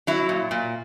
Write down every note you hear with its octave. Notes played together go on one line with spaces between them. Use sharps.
F#3 E4
A#2
A#2